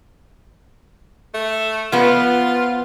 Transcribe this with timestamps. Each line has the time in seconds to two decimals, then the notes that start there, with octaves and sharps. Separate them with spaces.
1.34 A3
1.92 F3 B3 F4